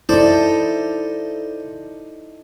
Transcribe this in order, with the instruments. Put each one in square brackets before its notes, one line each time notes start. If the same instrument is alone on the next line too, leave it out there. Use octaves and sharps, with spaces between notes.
[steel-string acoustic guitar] D#4 A4 [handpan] E4 [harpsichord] C5 D5